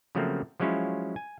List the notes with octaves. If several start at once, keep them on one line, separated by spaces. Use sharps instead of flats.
C#3 F3 F#3 A3 A#3 C4
F3 F#3 G#3 C#4 E4 F4
G#5